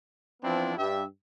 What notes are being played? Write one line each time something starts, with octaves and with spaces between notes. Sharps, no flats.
E3 F3 B3 C4 D4 E4
G2 G4 E5